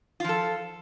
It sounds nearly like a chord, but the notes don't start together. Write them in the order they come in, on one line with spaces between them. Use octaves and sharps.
F4 F3 A4